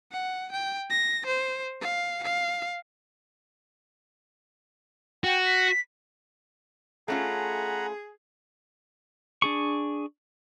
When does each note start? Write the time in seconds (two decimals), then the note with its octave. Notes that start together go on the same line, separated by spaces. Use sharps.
0.12 F#5
0.52 G5
0.90 A#6
1.26 C5
1.81 F5
2.23 F5
5.24 F#4 G5
5.45 B6
7.08 A3 C#4 F4 G#4 F#5 A#5 B5
9.42 D4 G#4 C#6